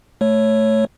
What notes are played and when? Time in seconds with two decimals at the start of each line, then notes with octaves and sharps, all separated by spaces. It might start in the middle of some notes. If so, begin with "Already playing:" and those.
0.21 A3 C#5